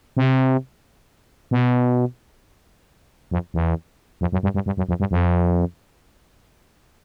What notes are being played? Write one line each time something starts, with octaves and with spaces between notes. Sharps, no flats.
C3
B2
F2
E2
F2
F#2
G2
G2
G2
F#2
F2
G2
F2